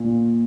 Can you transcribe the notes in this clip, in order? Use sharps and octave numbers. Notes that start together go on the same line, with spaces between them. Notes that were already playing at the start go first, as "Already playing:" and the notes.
Already playing: A#2